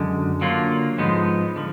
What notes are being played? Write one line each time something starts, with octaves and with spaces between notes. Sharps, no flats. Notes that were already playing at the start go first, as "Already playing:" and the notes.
Already playing: F#2 D3 G#3
D3 F#3 A#3 F4
G#2 F3 G#3 B3 D#4
D3 F3